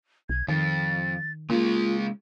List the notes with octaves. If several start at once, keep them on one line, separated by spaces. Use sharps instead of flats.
B1 G#6
F2 D#3 A6
C#3 G#3 A#3 F4